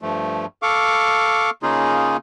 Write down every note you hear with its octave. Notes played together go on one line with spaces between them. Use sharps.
G2 F3 A3
A4 F5 C#6 D6
C#3 A#3 C#4 D#4 F4 G#4